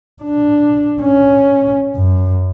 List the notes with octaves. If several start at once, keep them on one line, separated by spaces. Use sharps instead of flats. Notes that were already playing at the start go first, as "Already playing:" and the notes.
D4
C#4
F#2